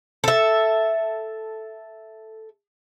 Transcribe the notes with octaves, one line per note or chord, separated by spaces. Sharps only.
A4 E5